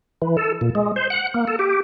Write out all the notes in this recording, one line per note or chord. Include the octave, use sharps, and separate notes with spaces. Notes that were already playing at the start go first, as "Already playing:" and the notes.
E3
A4
A#2
G#3
C5
F#5
A#3
A4
G4